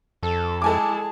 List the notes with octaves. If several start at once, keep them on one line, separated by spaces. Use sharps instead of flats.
F2 A4
G#3 E4 G#4 A4 G#5 A5 D6